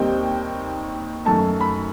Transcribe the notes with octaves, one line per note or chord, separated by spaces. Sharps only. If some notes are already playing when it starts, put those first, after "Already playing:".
Already playing: D#2 D#3 G3 C4 D#4 G5
F#2 D#3 A3 A5
B5